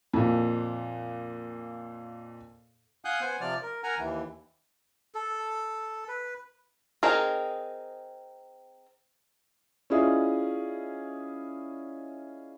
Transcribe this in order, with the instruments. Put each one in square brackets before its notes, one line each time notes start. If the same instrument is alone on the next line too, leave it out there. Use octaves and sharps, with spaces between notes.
[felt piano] F2 A#2
[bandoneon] F5 F#5 G#5 D#6 F#6 G6
B3 C5 F#5 G#5
C3 F3 D5 F6
A#4
A#4 F#5 G#5 A#5
D#2 E3
[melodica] A4
B4
[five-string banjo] C4 D#4 G#4 A#4
[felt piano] C#4 E4 F4 G#4 D5 D#5